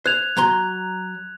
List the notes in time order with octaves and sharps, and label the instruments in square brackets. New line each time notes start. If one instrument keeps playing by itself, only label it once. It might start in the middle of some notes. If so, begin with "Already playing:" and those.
[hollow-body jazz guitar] C5 [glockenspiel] F#6 G#6 F7
[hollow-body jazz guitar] F#3 A#5 C6